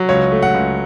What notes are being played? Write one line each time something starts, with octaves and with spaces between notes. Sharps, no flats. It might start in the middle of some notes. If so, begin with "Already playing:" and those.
Already playing: F#3
C#2 C#5
A3
F#5
C#2